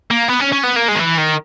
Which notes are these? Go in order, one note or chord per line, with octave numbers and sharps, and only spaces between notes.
A#3
B3
C#4
C#4
B3
A#3
G#3
D#3
E3
D#3